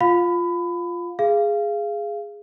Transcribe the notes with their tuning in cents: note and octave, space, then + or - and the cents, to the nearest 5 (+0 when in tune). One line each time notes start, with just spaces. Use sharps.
F4 +0 F5 +20 B5 +25
G#4 +0 F5 -20